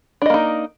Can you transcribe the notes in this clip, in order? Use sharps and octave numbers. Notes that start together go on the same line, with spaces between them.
A#3 D4 D#4 D#5